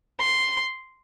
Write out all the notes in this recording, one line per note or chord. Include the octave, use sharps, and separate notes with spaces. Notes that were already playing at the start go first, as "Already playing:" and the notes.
C6